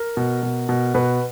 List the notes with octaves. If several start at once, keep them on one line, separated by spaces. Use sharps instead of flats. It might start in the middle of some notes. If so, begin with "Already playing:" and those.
Already playing: A#4
B2
B2
B2
B2 B4